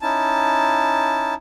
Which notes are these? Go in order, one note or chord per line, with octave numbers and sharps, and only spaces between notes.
C#4 D#4 E4 A5